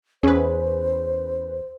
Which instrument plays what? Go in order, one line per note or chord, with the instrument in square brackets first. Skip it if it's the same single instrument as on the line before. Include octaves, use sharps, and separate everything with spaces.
[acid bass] E2 [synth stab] C#4 B4 [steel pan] G#4 [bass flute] C5